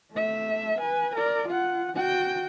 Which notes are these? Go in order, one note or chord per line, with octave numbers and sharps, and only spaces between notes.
A3 E5
B4 G#5
A#4 D5
F4 F#5
F#4 G5